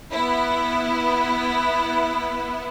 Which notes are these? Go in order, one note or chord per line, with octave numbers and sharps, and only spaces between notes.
B3 E4